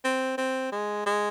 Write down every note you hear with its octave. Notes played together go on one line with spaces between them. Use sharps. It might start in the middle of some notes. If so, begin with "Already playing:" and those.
C4
C4
G#3
G#3